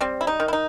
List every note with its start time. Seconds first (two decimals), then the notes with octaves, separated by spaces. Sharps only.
0.01 G3 C4
0.21 E4
0.27 D#4
0.40 D#3
0.48 E4
0.53 D#4